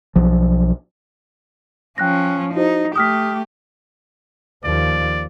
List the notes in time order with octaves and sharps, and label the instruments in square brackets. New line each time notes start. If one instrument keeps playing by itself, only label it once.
[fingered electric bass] B1 F3
[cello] F3 C#4 [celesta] G5 F#6 A#6
[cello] D#4 [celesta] E4 F#4 C5
[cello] A3 G4 [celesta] D#6 F6 B6
[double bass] D#2 F3 [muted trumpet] D5